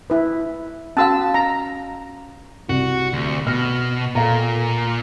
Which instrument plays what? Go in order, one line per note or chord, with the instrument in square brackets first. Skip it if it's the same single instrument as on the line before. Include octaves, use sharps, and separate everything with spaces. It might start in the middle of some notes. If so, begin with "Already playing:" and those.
[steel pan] E4 B4
[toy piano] C#4 F#4 F5 [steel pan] A5 E6
[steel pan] A#5
[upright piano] C2 [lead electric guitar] F#4
[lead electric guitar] D2
[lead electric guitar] B2 [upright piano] F6 A#6
[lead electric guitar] A#2 [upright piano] A4 F5 A#5